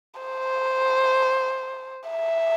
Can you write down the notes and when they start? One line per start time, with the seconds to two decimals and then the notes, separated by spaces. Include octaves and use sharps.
0.21 C5
2.09 E5